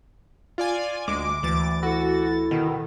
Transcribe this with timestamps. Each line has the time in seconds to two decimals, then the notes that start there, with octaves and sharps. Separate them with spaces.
0.58 F4 D5 G#5
1.08 D2 G#3 D6
1.43 D2 E3 A6
1.83 E4 F#4 A4
2.51 B2 D#3